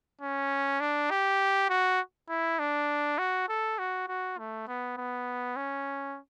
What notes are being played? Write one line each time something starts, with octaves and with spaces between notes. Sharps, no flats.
C#4
D4
G4
F#4
E4
D4
F#4
A4
F#4
F#4
A3
B3
B3
C#4